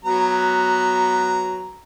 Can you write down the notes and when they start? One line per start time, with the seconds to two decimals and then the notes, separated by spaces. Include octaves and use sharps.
0.05 F#3 B3 A#5